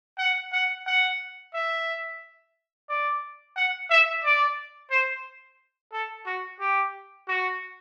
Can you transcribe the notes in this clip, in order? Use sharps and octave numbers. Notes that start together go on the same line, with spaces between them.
F#5
F#5
F#5
E5
D5
F#5
E5
D5
C5
A4
F#4
G4
F#4